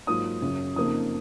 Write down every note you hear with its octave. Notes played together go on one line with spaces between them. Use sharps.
G#2 F#3 A#3 F4 D#6
F#2 C#3 F#3
F2 C#3 F3 A#3 D#4 D#6